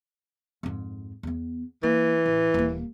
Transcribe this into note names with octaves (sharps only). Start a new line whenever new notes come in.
F2 G#2
E2 B3
E3 A#3
A1
D#1 A#3